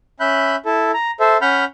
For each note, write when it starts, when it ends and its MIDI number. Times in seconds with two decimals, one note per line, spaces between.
0.20 0.56 61
0.20 0.56 76
0.20 0.56 83
0.20 0.56 90
0.20 0.56 91
0.66 0.91 64
0.66 0.91 69
0.94 1.11 82
1.20 1.37 69
1.20 1.37 72
1.20 1.37 76
1.42 1.65 61
1.42 1.65 78
1.42 1.65 83
1.42 1.65 89
1.42 1.65 91